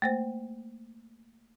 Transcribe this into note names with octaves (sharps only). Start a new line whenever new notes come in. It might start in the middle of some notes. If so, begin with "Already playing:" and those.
A3 A#3 C5